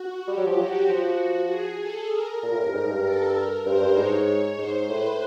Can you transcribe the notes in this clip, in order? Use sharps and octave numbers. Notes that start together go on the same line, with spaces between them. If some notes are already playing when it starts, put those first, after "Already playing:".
Already playing: F#4
G3 G4
F#3
F3
F#3 F#4
F3 F#4
G#4
A4
A#4
A#2
A2
G2
G#2
G2
A4
A#4
G2 C5
G2
G#2 C#5
C#5
G#2 C5
A2 B4